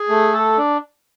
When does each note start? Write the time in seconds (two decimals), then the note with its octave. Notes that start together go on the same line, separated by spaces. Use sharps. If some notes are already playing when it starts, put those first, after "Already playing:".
Already playing: G#4
0.09 A3
0.33 A4
0.58 D4